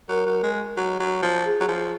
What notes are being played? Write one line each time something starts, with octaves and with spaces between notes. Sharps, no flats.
F#3 A#4
F#3
G#3
F#3
F#3
F3
G#4
F#3
F3